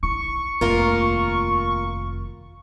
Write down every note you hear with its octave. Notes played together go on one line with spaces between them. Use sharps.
E4 C#6
F1 D#2 A#3 F4 A#4